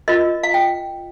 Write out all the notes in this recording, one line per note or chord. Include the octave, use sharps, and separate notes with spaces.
F4 A#4 D#5
F5
G5